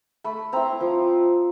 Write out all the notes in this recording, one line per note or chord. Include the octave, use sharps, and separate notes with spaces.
A3 B5
C4 E4 A#5
F3